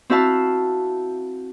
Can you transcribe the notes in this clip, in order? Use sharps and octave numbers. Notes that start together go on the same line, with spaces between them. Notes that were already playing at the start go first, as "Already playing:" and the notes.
C4 E4 F#4 E5 F5 A5